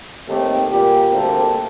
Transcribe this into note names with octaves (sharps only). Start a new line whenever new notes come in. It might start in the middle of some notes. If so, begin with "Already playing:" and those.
D#2 D#3 A3 C4 G4
A#2 G3 A#3 G4
D2 C3 G3 A#3 A4